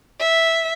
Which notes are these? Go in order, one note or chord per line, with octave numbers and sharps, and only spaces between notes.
E5